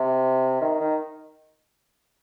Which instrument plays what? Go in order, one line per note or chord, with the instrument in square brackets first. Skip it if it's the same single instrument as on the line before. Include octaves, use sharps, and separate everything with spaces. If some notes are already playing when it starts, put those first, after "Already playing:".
Already playing: [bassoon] C3
D#3
D#3